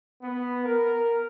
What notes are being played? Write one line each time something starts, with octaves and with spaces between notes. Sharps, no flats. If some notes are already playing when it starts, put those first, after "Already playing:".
B3
A#4